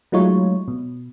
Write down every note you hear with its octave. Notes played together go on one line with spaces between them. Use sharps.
F#3 G#3 A3 D#4 F4 C#5
B2